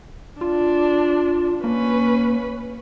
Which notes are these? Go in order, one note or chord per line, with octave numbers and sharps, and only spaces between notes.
D4 F4
A#3 C#4 B4